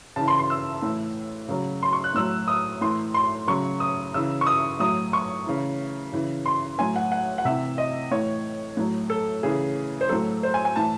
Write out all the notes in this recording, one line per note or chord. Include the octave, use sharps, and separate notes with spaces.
C#3 E3 A5
C6
C6
E6
A2 E3
C#3 F#3
C6
C#6
F#6
A2 F#3 E6
D#6
A2 E3 C6
C6
C#3 F#3 C#6
D#6
C#3 E3 E6
C#6
D#6
A2 F#3 D#6
C#6
C#3 E3
C#3 E3
C6
A2 F#3 G#5
F#5
F#5
F#5
C3 E3 E5
D#5
A2 E3 C#5
A2 F#3
A4
C#3 E3 G#4
C5
A2 F#3 A4
C5
G#5
G#5
A2 E3 A5